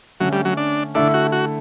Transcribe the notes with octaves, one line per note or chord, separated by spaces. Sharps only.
D3 F#3 A3 C#4
G3
F#3
D4
D3 A3 D4 E4 A4
F#4
F#4